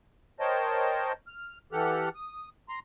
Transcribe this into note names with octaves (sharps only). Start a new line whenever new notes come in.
A#4 C5 C#5 D#5 G5 A5
F6
E3 G4 A4 F#5 F6
D#6
A#5 C6